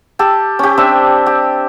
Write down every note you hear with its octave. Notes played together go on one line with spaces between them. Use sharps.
G4 A4
C#4 G4
C4 D4 E5
G4